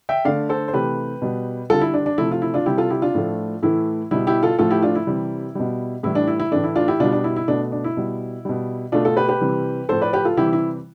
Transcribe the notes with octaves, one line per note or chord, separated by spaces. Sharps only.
E5 G5
D3 A3 D5 F5
A4 C5
C5
C3 E3 A3 G4 B4
B2 G3
D3 G3 F4 A4
E4
D4
D4
C3 F3 A3 E4
F4
E4
D4 F4
C3 G3 E4 G4
F4 A4
E4 G4
D4 F4
A2 F3 A3
A2 E3 A3 E4
B2 G3 E4
E4 G4
F4 A4
A2 F3 A3 F4 A4
E4 G4
D4 F4
E4
C3 E3 G3
B2 G3
A2 E3 G3 E4
D4
E4
E4
A2 E3 A3 D4
E4
D4 F4
E4 G4
B2 G3 D4 F4
D4
E4
E4
B2 A3 D4
D4
E4
B2 G3
B2 G3
B2 A3 D4 F4
F4 A4
G4 B4
G4 B4
C3 E3 G3
A2 F3 A3 A4 C5
B4 D5
G4 B4
F4 A4
C3 E3 G3 E4 G4
E4